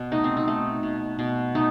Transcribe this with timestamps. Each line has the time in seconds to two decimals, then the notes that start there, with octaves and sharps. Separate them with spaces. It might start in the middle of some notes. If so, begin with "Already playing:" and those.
Already playing: B2
0.12 A3 D#4
0.24 C4
0.37 D#4
0.48 A3
0.83 B2
1.19 B2
1.55 A3 D#4